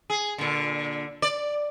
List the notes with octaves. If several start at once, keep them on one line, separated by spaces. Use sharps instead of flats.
G#4
A#2 D3
D5